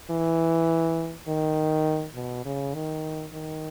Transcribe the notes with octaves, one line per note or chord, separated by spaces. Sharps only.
E3
D#3
B2
C#3
D#3
D#3